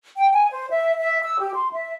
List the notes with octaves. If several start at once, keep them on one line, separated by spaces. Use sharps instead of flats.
G5
G#5
C5
E5
E5
E6
G4
C6
E5